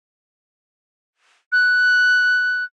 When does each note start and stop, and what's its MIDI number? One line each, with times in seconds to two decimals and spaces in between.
1.52 2.64 90